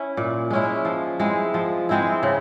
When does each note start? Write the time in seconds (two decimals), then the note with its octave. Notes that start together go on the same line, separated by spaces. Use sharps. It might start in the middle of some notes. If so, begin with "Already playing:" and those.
Already playing: C#4 E4
0.17 A#2
0.51 G#3 C#4 E4
0.85 F3
1.20 G#3 C4 E4
1.54 F3
1.89 G#3 C4 E4
2.23 C#3